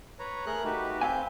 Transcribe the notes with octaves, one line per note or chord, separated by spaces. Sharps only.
B4 C#5 A#5
A3 G#4 A#4 A#5 F#6
A3 D#4 F#4 G4 B4
C4 E5 F5 G#5 G6